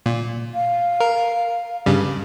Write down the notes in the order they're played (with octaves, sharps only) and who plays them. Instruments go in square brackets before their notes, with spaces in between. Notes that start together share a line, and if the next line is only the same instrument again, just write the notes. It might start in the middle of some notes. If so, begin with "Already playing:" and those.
[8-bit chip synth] A#2
[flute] F5
[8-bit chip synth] A#4
G2 C#3 G3